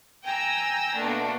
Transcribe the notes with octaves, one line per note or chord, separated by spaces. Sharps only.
G5 G#5 A#5 E6 A#6
B2 A3 A#3 D4